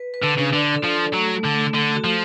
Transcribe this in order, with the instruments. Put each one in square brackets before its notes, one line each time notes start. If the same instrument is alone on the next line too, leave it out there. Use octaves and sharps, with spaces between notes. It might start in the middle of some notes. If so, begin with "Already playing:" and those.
Already playing: [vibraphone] B4
B4
[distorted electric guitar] D3
[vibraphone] D4
[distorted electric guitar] C#3
[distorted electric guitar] D3 [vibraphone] D5
[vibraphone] A4
[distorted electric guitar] F3
[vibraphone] A4
[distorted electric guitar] F#3 [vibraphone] A3
[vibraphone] A3
[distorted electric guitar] D3
[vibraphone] A3
[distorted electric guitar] D3 [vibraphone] A4
[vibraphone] F#4
[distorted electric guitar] F3